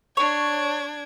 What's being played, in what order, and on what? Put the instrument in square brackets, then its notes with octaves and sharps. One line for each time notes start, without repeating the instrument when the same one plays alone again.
[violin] D4 G#6 [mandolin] C#5